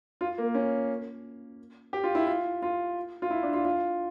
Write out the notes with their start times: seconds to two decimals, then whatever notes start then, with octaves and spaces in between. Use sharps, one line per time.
0.21 F4
0.38 A#3
0.55 C#4
1.93 G4
2.04 F4
2.15 E4
2.27 F4
2.62 F4
3.22 F4
3.30 E4
3.43 D4
3.53 F4
3.65 F4